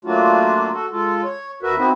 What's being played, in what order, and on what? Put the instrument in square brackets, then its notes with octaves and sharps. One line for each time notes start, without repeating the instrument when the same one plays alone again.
[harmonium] F#3 A3 A#3 D4 F4 F#4
F#4 A4
G#3 F4 A4
C#5
D#2 F#4 A#4 B4 E5
B3 C4 D#4 E4 F#4